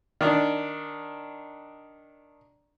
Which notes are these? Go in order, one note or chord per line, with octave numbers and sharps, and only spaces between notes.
D#3 D4